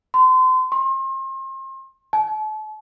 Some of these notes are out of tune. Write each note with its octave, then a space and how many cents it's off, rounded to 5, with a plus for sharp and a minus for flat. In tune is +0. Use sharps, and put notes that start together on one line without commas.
C6 -30
C6 +35
A5 -40